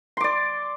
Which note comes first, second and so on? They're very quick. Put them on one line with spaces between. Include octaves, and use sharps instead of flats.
C6 D6 D5